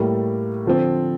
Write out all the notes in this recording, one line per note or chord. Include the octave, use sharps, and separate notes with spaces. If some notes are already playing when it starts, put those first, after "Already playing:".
Already playing: A2 G3 A#3
D3 F3 C4